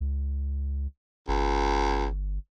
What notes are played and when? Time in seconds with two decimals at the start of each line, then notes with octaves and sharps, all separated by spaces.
0.01 C#2
1.28 G1 C#2